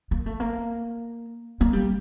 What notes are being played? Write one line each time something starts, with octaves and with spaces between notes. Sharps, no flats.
A#3
A3
A#3
A#3
G3